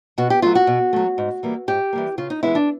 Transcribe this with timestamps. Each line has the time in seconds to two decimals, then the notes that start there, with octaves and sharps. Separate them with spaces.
0.18 B2 F#4
0.30 G4
0.42 F#3 A3 F4
0.55 F#4
0.67 B2
0.93 F#3 A3
1.18 G#2
1.43 E3 G3 A#3
1.68 G#2 G4
1.93 E3 G3 A#3
2.18 C#3 F4
2.30 D#4
2.43 E3 G#3 B3 E4
2.55 D4